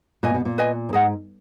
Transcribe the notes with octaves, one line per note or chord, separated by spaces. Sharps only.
A#2 B4 D#5 G#5
B2
A#2
B4 D#5 G#5
F#2
G#2 G#4 D#5 F#5